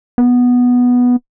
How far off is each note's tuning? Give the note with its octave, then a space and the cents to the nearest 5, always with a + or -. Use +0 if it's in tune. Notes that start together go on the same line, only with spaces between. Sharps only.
B3 -5